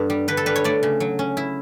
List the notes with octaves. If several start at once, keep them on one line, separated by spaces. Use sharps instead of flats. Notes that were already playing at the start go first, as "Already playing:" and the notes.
Already playing: G2 B3 A4
G3
D3 B4
A4
G3 B4
C#5
A3 D5
C#3
F#3
C#4
E4